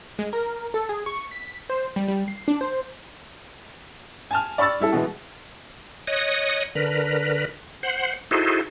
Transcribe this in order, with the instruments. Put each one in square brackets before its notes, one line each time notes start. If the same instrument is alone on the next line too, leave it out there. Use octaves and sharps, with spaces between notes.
[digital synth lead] G#3
A#4
A4
G#4
C#6
B6
C5
G3
G3
C7
D4
C5
[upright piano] G#5 A5 F6
D5 B5 C#6 E6 A6
G3 E4 A4
B2 E3 G#3 B3
[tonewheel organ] C#5 D#5 D#6 F#6
D3 A#4 B4
C5 F#5
D#4 E4 F#4 G#4 A4 C5